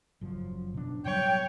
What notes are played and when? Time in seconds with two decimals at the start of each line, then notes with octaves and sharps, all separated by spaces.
0.21 F#1 F#2 F3
0.74 B2 D4
1.06 B2 F#3 G3 C#5 G5